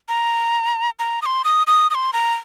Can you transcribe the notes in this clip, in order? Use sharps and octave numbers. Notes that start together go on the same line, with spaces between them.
A#5
A#5
D#6
C6
D#6
D#6
D#6
C6
A#5